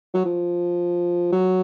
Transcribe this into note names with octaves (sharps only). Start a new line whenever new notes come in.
F#3
F3
F#3